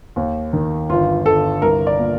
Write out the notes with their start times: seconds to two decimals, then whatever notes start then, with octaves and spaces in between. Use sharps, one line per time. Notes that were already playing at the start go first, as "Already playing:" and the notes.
0.16 D#2
0.53 D#3
0.89 G1 F4
1.26 G1 A4
1.62 C2 A#4
1.87 D5
1.99 A#2